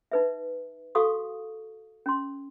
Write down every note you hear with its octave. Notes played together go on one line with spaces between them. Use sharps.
D#4 B4 E5
F#4 A4 F5 C#6 D#6
C#4 C6